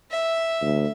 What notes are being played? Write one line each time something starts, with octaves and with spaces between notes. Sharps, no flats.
E5
D2